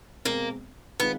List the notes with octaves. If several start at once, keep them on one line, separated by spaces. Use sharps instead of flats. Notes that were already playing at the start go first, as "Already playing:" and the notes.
B2 G#3 A#3 C4
D#3 G#3 B3 C4 F4